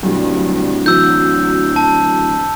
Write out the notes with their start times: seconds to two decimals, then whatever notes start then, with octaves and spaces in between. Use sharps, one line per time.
0.03 D1 B1 G2
0.86 E3 F#3 E6 G6
1.76 A5